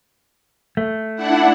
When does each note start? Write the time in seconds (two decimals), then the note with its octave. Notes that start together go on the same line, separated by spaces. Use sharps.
0.77 A3
1.16 D4 E4 F#5